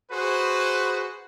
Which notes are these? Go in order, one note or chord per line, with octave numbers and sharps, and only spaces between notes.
F#4 G#4 B4 C5